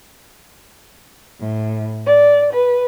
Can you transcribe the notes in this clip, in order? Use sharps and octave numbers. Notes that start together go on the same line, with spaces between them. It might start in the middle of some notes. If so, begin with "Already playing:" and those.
A2
D5
B4